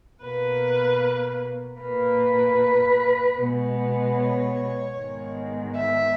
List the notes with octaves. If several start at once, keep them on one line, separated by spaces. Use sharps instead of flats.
B2 A#3 B4
A#2 A#3 B4
B2 G#3 B3
C#5
G#2 D#3 G#3 B3
E5